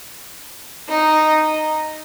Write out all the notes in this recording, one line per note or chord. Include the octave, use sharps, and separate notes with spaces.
D#4